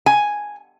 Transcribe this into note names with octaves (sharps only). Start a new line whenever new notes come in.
G#5